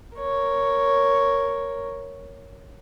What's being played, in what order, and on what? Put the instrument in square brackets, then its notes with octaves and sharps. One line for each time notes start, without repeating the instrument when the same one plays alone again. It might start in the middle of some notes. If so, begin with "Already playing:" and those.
[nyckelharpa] A#4 C#5